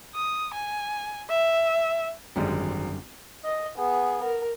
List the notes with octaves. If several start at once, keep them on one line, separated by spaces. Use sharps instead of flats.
D#6
G#5
E5
G#1 F#2 D3 G3 G#3
D#5
B3 G#4
A#4